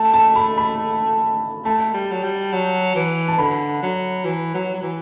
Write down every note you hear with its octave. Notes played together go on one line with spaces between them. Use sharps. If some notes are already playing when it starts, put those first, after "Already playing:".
Already playing: A3 A5
A5
B5
B5
A3 A5
G3
F#3
G3
F#3
E3
A5
D3 B5
F#3
E3
F#3
F#3
E3